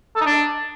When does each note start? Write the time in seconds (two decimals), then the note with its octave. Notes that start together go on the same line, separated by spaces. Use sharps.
0.16 A4
0.21 D#4
0.26 D4